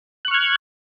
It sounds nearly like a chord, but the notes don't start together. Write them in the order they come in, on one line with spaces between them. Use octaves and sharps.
F#6 C#6 F6 G#6